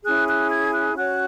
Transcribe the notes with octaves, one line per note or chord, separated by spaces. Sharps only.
C#4 E4 G#4 F#6
F#6
G#6
F#6
C#4 F#4 C#5 F#6